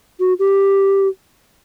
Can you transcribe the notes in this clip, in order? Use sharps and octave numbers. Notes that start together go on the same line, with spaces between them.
F#4
G4